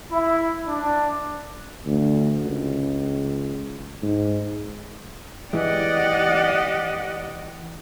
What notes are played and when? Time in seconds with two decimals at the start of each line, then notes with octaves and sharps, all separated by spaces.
0.12 E4
0.69 D4
1.86 D2
2.45 C#2
4.03 G#2
5.53 E3 G#3 G4 D5 D#5 F#5